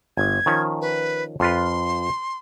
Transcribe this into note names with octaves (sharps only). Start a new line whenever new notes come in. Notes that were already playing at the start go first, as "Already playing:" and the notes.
G1 G#6
D#3 F3 C#4
B4
F2 F4 B4 C6